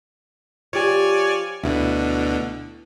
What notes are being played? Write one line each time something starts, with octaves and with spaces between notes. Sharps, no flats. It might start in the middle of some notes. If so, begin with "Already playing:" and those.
F3 G4 C#5 D5 G#5
D2 B2 D3 E4